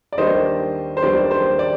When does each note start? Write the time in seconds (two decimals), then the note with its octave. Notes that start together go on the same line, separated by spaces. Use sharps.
0.12 D5
0.18 D#2 D#3 G3 D4 C5 D#5
0.97 C5
1.02 D#2 D#3 G3 D4 D5
1.31 C5
1.59 D5